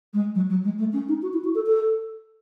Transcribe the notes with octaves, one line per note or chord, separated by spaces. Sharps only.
G#3
F#3
F#3
G#3
A3
C#4
D#4
F#4
E4
F#4
A4
A4